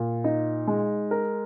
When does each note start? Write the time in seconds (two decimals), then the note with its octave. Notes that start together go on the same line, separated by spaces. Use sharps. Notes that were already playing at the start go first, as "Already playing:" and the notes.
Already playing: A#2
0.24 D#4
0.67 G#3
1.11 A#4